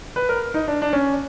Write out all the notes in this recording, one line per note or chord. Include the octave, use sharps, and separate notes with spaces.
B4
A#4
D#4
D4
D4
C#4